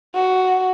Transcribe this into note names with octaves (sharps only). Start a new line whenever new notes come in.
F#4